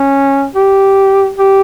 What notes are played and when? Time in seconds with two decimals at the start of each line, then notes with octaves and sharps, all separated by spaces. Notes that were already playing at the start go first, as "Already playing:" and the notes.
Already playing: C#4
0.56 G4
1.38 G4